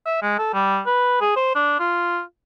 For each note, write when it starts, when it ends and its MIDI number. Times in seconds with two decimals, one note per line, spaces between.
0.06 0.20 76
0.22 0.38 56
0.38 0.51 69
0.54 0.80 55
0.86 1.18 71
1.21 1.32 68
1.37 1.52 72
1.55 1.76 62
1.80 2.21 65